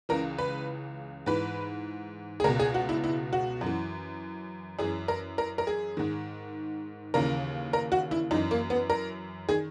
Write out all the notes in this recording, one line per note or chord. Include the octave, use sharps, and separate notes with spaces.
C#2 C#3 E3 A#4
B4
G#2 E3 B4
G#4
C#2 B2 A#4
G#4
F#4
E4
E4
F#4
F#2
E3
F#2 E3 G#4
A#4
A#4
A#4
G#4
G#2 D#3
D#2 C#3 E3 A#4
A#4
F#4
E4
F#2 E3 D#4
A#3
B3
A#4
D#3 G#4